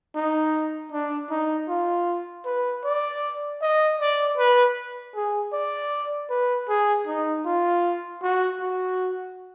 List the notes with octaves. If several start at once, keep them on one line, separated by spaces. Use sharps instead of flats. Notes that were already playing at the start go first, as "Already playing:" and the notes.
D#4
D4
D#4
F4
B4
D5
D#5
D5
B4
G#4
D5
B4
G#4
D#4
F4
F#4
F#4